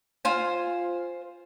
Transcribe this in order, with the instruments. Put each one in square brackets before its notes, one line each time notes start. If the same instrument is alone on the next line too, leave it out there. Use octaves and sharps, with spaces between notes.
[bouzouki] F4 C5 G#5